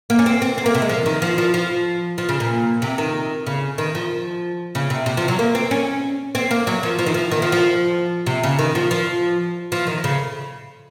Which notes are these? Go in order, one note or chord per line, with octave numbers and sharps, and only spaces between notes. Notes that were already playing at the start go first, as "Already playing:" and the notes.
A#3
C#4
C4
C4
C4
A#3
C3
G#3
F3
D#3
F3
F3
F3
F3
C#3
A#2
C3
D#3
C#3
D#3
F3
C#3
C3
C3
F3
F#3
A#3
C4
C#4
C4
A#3
F#3
F3
F3
D#3
F3
D#3
F3
F3
C3
C#3
D#3
F3
F3
F3
D#3
C#3